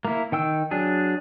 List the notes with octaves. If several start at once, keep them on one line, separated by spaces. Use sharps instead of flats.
A#3 E4
D#3 G5 E6
F#3 D4 G#4